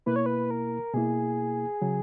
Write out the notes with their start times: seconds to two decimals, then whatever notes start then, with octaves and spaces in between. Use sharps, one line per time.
0.06 B2 A#3 E4 B4
0.16 C#5
0.26 B4
0.51 A#4
0.94 B2 A#3 E4 G#4
1.82 C#3 F#3